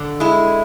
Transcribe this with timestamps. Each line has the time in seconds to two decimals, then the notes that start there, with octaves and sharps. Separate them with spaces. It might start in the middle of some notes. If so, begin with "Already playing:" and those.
Already playing: D3
0.20 G#3 E4